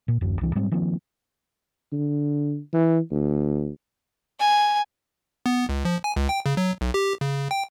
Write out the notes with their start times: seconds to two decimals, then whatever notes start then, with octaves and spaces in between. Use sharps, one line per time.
0.08 A#2
0.21 D1 A1 F#2 F#3
0.41 C2 E3
0.55 G#2 F#3 G3 C4
0.72 D#3 F3 A#3 C4
1.92 D3
2.73 E3
3.11 D2
4.39 G#5
5.46 B3
5.69 C#2
5.85 F3
6.04 G#5
6.16 C#2
6.29 G5
6.46 C#3
6.57 F#3
6.81 B1
6.94 G4
7.21 C#3
7.51 G5